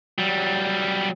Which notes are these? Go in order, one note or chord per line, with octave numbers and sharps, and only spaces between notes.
F#3 G3